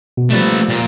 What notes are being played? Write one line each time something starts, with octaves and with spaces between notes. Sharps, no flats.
B2
F3 G3 A3 A#3 B4
A#2